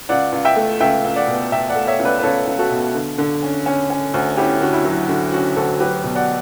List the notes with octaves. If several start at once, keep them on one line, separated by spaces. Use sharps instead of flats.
C#2 D5 F#5
C#2
E5 G5
A3
C#2 E5 G5
C#2
D5 F#5
B2
B2 E5 G5
D5 F#5
A3
C#5 E5
C#2
B4 D5
B4
C#2 A4 C#5
C#2
F#4 A4
B2
D3
D3
C#4
C#4
C#4
D2
C#4 E4 G4
D3 F#4
E4
F#3
D3 F#4
C#4 F#4
D2 F#4 A4
F#3 G4 B4
B2
D5 F#5